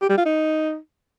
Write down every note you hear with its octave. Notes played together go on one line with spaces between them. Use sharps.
G4
G3
F4
D#4